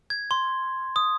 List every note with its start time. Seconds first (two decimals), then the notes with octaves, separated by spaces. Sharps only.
0.10 G#6
0.31 C6
0.96 D#6